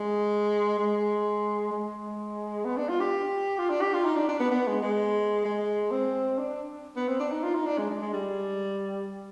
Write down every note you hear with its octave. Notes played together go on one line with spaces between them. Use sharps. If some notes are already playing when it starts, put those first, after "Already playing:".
Already playing: G#3
G#3
G#3
B3
D4
F4
G4
F4
D4
G4
F4
D#4
D4
D4
B3
B3
G#3
G#3
G#3
C4
D4
B3
C4
D4
D#4
F4
D#4
D4
G#3
G#3
G#3
G3